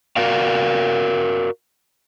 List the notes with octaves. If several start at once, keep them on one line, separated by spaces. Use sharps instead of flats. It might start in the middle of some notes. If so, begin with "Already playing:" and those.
F#4 A#4 D5 F5